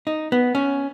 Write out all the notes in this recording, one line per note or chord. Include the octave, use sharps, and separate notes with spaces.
D#4
B3
C#4